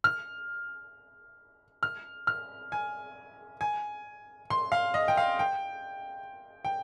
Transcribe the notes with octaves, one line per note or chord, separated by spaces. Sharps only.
F6
F6
F6
G#5
G#5
C6
F5
D#5
G5
F5
G5
G5